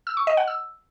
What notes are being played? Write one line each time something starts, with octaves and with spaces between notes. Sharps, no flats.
E6
C#6
D#5
F#5
E6